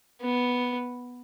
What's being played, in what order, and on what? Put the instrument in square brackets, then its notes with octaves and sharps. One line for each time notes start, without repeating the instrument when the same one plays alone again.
[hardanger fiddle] B3